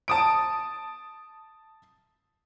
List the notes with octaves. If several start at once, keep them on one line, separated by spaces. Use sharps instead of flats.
A5 D#6 D7